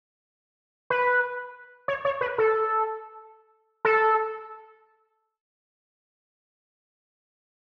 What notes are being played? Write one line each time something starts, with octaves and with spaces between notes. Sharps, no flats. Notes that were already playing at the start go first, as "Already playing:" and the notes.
B4
C#5
C#5
B4
A4
A4